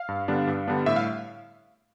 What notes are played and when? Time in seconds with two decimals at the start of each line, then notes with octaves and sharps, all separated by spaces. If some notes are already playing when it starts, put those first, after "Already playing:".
Already playing: F5
0.09 G2
0.28 D3 G3 B3 D4
0.47 G2
0.68 D3 G3 B3 D4
0.86 A2 E5
0.96 F5